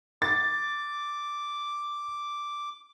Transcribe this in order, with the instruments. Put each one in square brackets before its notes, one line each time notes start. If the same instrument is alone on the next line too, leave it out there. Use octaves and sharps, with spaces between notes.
[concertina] D6 [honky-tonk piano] A6